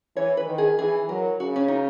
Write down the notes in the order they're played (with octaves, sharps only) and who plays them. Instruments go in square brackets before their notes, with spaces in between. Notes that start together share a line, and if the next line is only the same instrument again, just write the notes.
[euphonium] E3 [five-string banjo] C#5
[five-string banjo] B4
[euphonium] D#3
[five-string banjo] G#4
[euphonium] E3 [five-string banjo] G#4
[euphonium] F#3 [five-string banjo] A#4
[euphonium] C#3 [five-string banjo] F#4
[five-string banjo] C#4
D#4